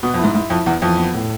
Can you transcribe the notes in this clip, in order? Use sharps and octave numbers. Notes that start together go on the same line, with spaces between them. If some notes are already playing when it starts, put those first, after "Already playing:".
B2 B3
F2
G#2 E4
G#2 E4
F2 E4
E2 B3
F2 E3
B3
A2